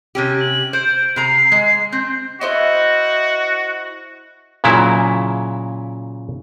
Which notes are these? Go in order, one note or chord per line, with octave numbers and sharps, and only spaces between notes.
C3 C#4 G4
F#7
C5 D7
C3 A#5 C7
G#3
C4 G6
E4 F#4 C5 D#5
A#2 C#3 F#3 E4